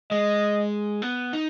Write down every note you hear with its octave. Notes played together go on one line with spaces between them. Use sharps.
G#3 D#5
B3
D#4